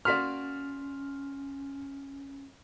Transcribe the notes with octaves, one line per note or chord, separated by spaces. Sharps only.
A#3 C#4 F#4 D5 C6 F6 B6